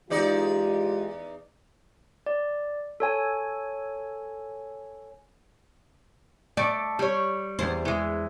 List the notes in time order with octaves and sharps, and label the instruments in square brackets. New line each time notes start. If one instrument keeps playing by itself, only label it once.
[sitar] E2 D#4 D5 [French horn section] G#3 F4 G4
[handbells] D5
A4 C#5 G#5
[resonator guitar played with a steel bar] A3 [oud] D5
[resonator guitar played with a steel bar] G3 C#5
[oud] E2 C5
[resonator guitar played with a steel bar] E3 G#3